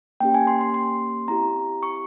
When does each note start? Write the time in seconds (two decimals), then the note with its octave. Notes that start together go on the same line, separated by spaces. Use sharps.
0.20 A#3 C#4 G4 G5
0.34 G#5
0.47 C6
0.61 C6
0.74 C6
1.28 C4 E4 G4 A#5
1.83 C#6